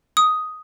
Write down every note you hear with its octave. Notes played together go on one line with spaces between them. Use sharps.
D#6